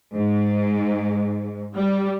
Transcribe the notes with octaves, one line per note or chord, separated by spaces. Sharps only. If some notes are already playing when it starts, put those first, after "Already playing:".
G#2
G3